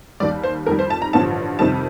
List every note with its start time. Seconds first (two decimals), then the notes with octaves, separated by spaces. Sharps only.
0.20 D#2 D#3 G3 D5
0.43 C5
0.66 F2 D#3 G3 A#4
0.79 C5
0.90 A5
1.02 A#5
1.13 A1 G2 D3 F3 A5
1.59 F2 C3 D#3 G3 A5